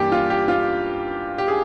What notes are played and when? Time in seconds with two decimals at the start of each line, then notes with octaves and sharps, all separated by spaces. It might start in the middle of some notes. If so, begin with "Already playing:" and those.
Already playing: G2 E3 G3 A#3 G4
0.12 F4
0.30 G4
0.48 F4
1.38 G4
1.48 G#4